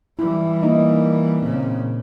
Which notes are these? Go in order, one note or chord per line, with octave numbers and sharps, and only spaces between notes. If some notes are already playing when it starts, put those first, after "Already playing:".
E3 G3 E4
A#3 D#4 D#5
A#2 C#3 C4